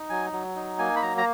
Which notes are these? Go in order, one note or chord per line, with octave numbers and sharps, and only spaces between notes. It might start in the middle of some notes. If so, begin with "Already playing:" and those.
Already playing: D#4
F#3 G#5
F#3
D#4
A#3 G#5
B5
F#3 A#5
A#5